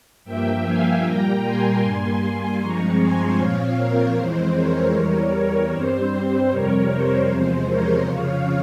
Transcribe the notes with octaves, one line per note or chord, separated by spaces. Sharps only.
G2 F3 A#3 E5 G5
F5 G#5
A#2 G3 A#3 G5 A#5
G#5 C6
G2 G3 A#3
G2 F3 G#3 C4 A#5 C#6
G#5 C6
A#2 F3 C4 C#5 F5
A#4 C#5
F2 E3 G#3 C4 C5
A#4 C#5
E2 E3 G3
G2 G3 C4 C5
F2 C3 G3 A#4 C#5
C5
E2 C3 F3 G#3 C5
A#4 C#5
F2 C#3 F3 C#5 F5